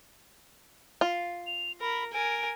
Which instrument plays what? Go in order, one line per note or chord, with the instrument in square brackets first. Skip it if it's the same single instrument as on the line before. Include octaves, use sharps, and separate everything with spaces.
[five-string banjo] F4
[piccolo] F7
[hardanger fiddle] A#4 [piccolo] B5
[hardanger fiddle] A#4 G#5 [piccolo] D7